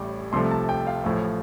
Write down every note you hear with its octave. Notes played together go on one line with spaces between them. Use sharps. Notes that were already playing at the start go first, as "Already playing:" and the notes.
Already playing: A1 A2 G3 D6
C2 C3 F3 A3 C6
A5
G5
F5
A1 A2 F3 A3